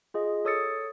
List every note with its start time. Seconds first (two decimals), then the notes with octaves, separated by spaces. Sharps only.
0.14 F4 G#4 D#5
0.45 A4 C#5 D#6 E6 A6 C#7